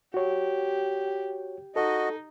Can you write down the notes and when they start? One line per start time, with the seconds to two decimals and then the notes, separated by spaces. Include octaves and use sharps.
0.14 F#4 G4 C#5
1.76 D#4 F#4 A4 D#5